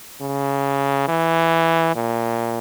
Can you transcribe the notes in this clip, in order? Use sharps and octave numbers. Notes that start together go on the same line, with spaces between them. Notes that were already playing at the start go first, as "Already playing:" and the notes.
C#3
E3
A#2